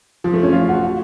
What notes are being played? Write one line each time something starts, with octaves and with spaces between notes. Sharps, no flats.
F3
A3
C#4
F4
F#4
F#4